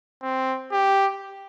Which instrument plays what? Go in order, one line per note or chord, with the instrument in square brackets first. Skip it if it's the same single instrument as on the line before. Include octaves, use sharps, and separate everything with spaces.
[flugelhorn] C4
G4